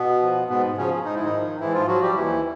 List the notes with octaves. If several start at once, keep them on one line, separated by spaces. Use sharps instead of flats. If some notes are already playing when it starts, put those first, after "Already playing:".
Already playing: B2 B3
F3
G#2 B2 B3
C#3 F3 C#4
G#2 D#4
E4
D#3 D#4
F3
G#2 E3 E4
F3 F4
F3 F#3 F#4
G3 G4
D#2 E3 E4